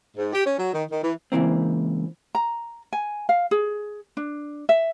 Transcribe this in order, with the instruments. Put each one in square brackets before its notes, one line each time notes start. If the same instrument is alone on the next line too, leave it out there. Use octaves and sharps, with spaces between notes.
[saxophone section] G#2
G4
C#4
F#3
D#3
D#3
E3
[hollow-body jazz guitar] C#2 G2 E3 A#3 C4
[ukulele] A#5
G#5
F5
G#4
D4
E5